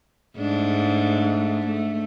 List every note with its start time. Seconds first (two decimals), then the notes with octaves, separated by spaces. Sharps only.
0.38 G#2 A3 D4
1.67 A3